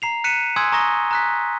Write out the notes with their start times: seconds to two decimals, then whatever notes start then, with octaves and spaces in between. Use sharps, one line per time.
0.02 A#5 C7 F7
0.24 F#6 B6 C#7 D#7 E7
0.56 G#5 C6 D#6 E6 F#6 G#6
0.72 G#5 A#5 C#6 D#6 A#6 G7
1.11 A#5 F#6 B6